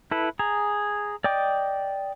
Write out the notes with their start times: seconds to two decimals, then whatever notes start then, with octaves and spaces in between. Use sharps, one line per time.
0.11 E4 A4 B4
0.39 G#4 A#5
1.24 D5 D#5 G5 D6